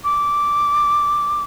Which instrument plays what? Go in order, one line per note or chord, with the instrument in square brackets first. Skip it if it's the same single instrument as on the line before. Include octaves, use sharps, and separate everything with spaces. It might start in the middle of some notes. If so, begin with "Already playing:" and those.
[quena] D6